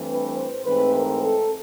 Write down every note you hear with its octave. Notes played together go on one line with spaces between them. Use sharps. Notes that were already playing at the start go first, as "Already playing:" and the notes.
Already playing: G2 E3 A3 C4
B4
C5
G#2 E3 A3 C4 B4
A#4
A4